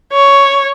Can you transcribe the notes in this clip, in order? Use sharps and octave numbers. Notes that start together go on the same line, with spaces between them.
C#5